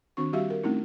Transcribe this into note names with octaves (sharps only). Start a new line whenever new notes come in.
D#3 C4 D4 F#4 C#6
G3 F#4 G4 E5 F5
A#4
A3 C4 C#4 D#4 E4